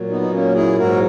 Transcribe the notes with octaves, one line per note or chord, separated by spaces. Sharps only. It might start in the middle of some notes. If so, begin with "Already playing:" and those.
Already playing: A#2 F#3
B3 D#4
D#4
A#3 C#4
E4 G#4
G#2 F#3 F#4 A#4